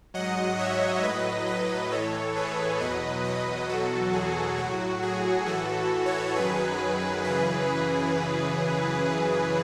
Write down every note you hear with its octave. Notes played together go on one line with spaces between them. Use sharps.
G#2 F#3 D#5 F#5
C#5 E5
A2 F#3 B4 D#5
B4 D#5
A2 E3 A4 C#5
G#4 B4
E2 B2 F#3 B4 D#5
B4 D#5
E2 B2 F#3 F#4 A4
G#4
A2 F#3 F#4
G#4
A2 E3 F#4 A4
A4 C#5
F#2 D#3 F#3 G#4 B4
F#2 C#3 E3 G#4 B4